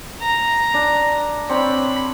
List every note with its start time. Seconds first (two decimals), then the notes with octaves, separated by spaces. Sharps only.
0.21 A#5
0.74 D4
1.49 C4 D4 C#5 B5